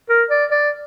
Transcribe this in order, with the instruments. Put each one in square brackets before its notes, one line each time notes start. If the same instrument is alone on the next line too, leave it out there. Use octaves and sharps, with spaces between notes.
[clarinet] A#4
D5
D5